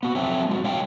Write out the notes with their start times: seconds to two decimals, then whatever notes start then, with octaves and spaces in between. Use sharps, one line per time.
0.03 B3 F#4
0.15 F3 F#3 A3 C4
0.49 G#3 F4 F#4
0.64 G#3 C#5 F5 G5